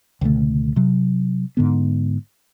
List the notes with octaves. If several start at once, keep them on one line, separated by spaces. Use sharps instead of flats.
C#2 B2 D3 A3
C3 F#3
G#2 D3 B3